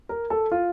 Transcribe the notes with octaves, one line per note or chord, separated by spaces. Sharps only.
A#4
A4
F4